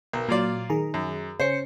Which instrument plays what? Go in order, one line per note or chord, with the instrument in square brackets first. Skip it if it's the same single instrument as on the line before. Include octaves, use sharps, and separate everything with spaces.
[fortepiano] B1 [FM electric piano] A#4
[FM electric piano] A#2 F#3 [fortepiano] A#3 F4 D5
[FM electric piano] D#3 G#4 A#5
[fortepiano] F#2
[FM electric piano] C#3 C#4 C#7 [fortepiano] C5